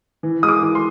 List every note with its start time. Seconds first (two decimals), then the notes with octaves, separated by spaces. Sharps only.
0.23 E3
0.43 G#3 D#6
0.49 D6
0.62 E3
0.75 C6